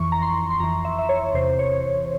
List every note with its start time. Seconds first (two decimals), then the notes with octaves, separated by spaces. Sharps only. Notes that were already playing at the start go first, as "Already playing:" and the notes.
Already playing: F2 E3 C#6
0.12 A#5
0.22 C6
0.50 C6
0.60 F2 E3 A#5
0.85 E5
0.99 E5
1.09 C#5
1.34 E2 C3 E3 C5
1.59 C#5